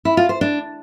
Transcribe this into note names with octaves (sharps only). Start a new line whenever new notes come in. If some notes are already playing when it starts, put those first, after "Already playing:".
E4
F4
C5
D4